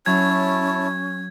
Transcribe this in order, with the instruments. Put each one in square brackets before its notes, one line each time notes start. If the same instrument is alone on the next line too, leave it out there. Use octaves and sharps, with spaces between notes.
[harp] F#3 [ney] C#4 [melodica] E4 C#5 A5 [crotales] G#6